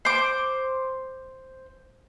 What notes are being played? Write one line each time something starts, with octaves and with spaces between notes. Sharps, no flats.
C5 D6